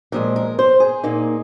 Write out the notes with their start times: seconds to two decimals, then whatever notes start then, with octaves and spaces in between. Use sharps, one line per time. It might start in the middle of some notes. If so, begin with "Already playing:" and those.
0.12 A#2 F3 G#3 A#4
0.36 A#4
0.59 C5
0.80 G#4
1.04 A#2 A#3 D#4